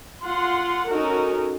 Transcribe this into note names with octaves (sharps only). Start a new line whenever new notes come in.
F4 F#5 C6
C#4 D#4 F#4 A4 A#4